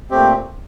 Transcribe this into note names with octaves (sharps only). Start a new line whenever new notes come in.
A#2 A3 C4 G4